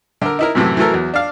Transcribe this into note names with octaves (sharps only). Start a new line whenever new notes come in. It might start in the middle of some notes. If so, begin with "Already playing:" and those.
D3 A#4
D#4 E4 A#4
F#2 A2 C3 E3 F#3 A3
E3 F#3 A3 A4 A#4
E2 F#3
D4 F5